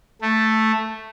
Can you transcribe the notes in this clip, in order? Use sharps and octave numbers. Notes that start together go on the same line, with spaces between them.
A3